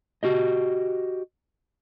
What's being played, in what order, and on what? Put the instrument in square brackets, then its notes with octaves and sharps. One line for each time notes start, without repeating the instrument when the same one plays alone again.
[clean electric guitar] F#4 G4 D#5